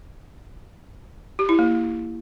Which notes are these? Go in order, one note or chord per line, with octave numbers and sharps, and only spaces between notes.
G4
E4
A#3